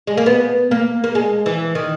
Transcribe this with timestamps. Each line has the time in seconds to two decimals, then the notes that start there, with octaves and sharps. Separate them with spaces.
0.07 G#3
0.17 A#3
0.26 B3
0.71 A#3
1.04 A#3
1.15 G#3
1.46 E3
1.75 D#3